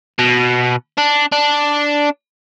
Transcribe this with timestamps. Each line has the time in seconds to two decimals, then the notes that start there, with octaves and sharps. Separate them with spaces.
0.19 B2
0.98 D4
1.32 D4